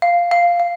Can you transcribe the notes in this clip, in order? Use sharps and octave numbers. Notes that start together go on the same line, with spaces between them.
F5
F5
F5